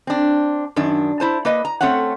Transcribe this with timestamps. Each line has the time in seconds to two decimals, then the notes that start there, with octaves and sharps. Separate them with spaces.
0.07 C4 D4
0.76 F#2 D#3 D4
1.20 E4 C5 A5
1.45 A#3 B4 D#5
1.65 A#5
1.81 A3 C4 C#4 C#5 F#5